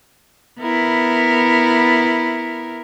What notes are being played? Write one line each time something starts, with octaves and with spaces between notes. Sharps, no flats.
B3 E4 A#4